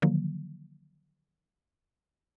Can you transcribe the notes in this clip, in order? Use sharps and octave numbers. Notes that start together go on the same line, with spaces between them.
D3 D#3 F3 F#3 A#3